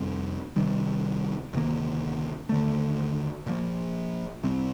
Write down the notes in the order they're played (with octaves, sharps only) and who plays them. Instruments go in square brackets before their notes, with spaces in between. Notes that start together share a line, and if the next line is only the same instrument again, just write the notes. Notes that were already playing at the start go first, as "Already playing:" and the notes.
Already playing: [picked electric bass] F2 C3 G3 C4
C2 C3 D#3 G3
D2 C3 D#3 A#3
D#2 D3 A3
A#2 F3 A#3
C2 C3 G3 C4